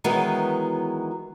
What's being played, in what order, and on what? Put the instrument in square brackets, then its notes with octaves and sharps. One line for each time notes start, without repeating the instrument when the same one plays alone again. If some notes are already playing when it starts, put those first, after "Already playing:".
[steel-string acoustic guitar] D#3 E3 F#3 G#3 B3